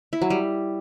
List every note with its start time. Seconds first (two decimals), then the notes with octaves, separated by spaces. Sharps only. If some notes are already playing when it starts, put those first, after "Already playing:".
0.13 E4
0.22 F#3
0.30 G3